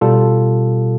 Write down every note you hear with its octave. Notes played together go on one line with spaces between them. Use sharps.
B2 G3 F4 A4